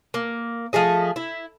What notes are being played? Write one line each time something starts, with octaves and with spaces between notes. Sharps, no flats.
A#3
F3 A3 G#4 D#5
E4